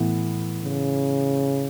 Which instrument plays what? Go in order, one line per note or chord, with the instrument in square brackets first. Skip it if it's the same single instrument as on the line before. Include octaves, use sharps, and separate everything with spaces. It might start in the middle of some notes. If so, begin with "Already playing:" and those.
Already playing: [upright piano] A2 E3 B3 E4
[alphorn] C#3